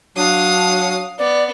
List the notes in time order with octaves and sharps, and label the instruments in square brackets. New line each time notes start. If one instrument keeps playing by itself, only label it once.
[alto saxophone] F#3 [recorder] D4 [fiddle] F5 D#6
[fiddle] B3 [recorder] D5